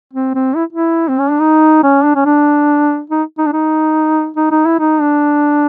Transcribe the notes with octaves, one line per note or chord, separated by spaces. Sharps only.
C4
C4
E4
E4
C4
C#4
D4
D#4
C#4
D4
C#4
D4
D#4
D#4
D4
D#4
D#4
D#4
E4
D#4
D4